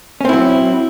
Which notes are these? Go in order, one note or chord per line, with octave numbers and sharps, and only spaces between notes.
F#3 C4 C#4 E4